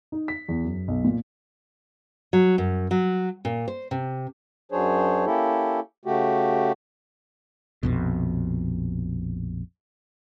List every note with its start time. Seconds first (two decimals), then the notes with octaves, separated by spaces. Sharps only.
0.12 D#4
0.28 B6
0.48 E2
0.64 F#2
0.88 B1
1.05 A#2
2.33 F#3
2.58 F#2
2.91 F#3
3.45 A#2
3.68 C5
3.91 C3
4.72 F#2 F#3 D4 G#4 C5 C#5
5.26 A#3 C#4 E4 G4 A4
6.05 C#3 A3 F#4 G4
7.83 A#1 F2 B2